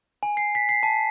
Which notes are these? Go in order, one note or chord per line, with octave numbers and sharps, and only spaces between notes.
G#5
C7
B6
C7
A5